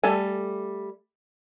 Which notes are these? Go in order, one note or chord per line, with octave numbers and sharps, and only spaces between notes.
G3 A3 A4 G#5